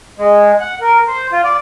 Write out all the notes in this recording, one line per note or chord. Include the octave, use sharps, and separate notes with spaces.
G#3
F#5
A#4
C5
F4
D5